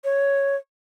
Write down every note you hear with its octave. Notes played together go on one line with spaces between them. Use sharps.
C#5